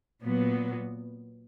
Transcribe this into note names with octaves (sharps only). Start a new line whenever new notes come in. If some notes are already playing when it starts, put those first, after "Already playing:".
A#2 F#3 B3